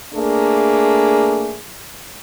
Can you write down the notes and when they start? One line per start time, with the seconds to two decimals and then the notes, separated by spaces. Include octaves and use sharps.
0.14 A3 A#3 D4 G#4